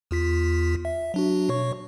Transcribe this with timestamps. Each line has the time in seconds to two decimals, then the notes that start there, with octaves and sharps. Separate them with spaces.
0.11 E2 F4 B6
0.85 E5
1.14 F#3 D4 F#4
1.49 B2 C#5 C#6